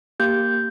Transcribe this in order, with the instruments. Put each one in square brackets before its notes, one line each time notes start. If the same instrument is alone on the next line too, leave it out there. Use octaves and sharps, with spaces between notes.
[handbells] A#3 G4 G6